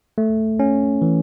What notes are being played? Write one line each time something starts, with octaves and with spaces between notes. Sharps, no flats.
A3
C#4
E3